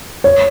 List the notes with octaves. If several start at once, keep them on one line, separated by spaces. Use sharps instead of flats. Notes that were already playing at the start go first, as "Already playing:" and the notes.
C#5